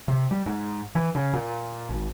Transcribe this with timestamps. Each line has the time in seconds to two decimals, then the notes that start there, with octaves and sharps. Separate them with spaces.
0.08 C3
0.31 G3
0.46 G#2
0.95 E3
1.15 C#3
1.33 A#2
1.89 G#1